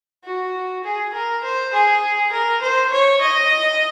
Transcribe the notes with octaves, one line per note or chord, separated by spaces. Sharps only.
F#4
G#4
A#4
C5
G#4
A#4
C5
C#5
D#5